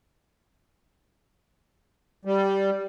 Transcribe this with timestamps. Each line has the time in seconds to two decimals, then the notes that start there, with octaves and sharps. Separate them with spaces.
2.25 G3